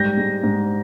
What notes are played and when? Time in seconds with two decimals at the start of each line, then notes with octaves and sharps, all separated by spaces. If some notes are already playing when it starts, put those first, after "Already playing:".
Already playing: G#2 G3 G6 A#6
0.17 G#3
0.43 G#2